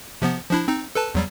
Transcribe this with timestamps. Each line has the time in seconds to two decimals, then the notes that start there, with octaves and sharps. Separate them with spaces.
0.22 C3 F3 B3
0.51 F3 D4 E4
0.68 C4 D#4
0.95 A4 B4 A5
1.15 E2 F#3 G3